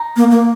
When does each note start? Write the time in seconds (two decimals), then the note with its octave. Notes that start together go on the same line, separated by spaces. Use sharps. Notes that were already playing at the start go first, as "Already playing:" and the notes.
Already playing: D#4
0.16 A#3
0.31 A#3